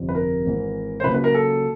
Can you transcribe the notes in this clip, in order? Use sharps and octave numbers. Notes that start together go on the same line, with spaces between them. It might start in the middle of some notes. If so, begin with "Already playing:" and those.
Already playing: G1 F2 C3
B4
A#4
G#1 G#2 E3 G#3
C5
C#2 C#3 F#3 A#3 B4
B4
A#4
A4